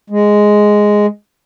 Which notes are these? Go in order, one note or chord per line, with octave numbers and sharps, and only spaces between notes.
G#3